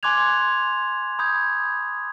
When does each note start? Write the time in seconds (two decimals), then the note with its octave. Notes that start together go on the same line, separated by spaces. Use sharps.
0.03 G#5 C6 D6 F#6 G#6 F7
1.19 B5 D#6 G6 G#6